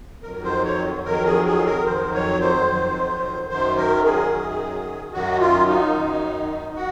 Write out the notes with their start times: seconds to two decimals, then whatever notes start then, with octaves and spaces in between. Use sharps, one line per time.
0.23 F2 D#3 F#3 A#4
0.44 C5
0.64 C#5
1.05 F2 D#3 F#3 A#4
1.25 G#4
1.46 G#4
1.66 A#4
1.86 F2 D#3 F#3 C5
2.14 C#5
2.41 C5
2.68 F2 D#3 F#3
3.50 F#2 D#3 F#3 C5
3.77 A#4
4.04 G#4
4.31 F#2 D#3 F#3
5.13 F#2 D#3 F#3 F#4
5.40 F4
5.67 D#4
5.94 F#2 D#3 F#3
6.76 F#4